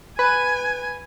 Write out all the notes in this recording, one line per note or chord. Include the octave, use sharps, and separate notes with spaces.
B4 G#5